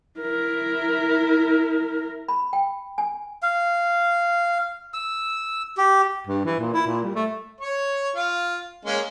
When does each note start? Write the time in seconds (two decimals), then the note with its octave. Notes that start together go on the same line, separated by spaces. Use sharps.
0.20 E4 A#4
2.28 B5
2.53 G5
2.98 G#5
3.43 F5
4.94 E6
5.77 G4
6.27 G2
6.45 E3
6.60 A#2
6.74 E4
6.86 A#2
7.03 G3
7.15 A3
7.61 C#5
8.16 F4 F5
8.85 G#3 A#3 C#4